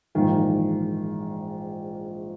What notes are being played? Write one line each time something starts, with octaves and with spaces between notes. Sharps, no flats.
A#1 G#2 D#3 E3 A#3